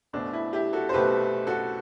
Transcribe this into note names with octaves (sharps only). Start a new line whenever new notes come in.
B1 B2 A3 C4 D4
E4
E4 G4
F#4 A4
C5
B1 B2 A3 C4 G4 B4
F#4 A4